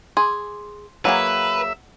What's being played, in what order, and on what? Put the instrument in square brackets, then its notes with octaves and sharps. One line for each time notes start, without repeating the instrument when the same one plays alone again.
[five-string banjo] G#4 [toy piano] C6 D6
[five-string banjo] F#3 A#3 G#4 [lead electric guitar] B4 [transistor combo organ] E5 [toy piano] F#5